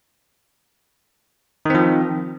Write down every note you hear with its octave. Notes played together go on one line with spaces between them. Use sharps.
D#3 F3 C4